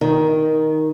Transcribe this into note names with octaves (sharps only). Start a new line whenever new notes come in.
D#3